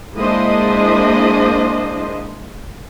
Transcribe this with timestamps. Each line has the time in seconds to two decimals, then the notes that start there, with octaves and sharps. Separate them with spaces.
0.14 G#3 A#3 D4 E4 C5 D#5